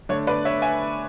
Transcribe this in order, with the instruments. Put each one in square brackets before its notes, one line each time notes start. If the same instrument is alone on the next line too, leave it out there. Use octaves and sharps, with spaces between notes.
[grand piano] D3 A3 D4 C#5
B4 D5
C#5 E5
E5 G#5